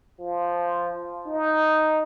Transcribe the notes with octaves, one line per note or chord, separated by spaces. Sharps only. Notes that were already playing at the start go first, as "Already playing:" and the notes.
F3
D#4